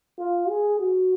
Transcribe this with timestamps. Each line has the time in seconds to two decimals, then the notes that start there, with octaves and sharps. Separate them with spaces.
0.19 F4
0.49 G#4
0.79 F#4